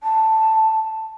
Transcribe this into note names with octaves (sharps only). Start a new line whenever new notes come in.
A5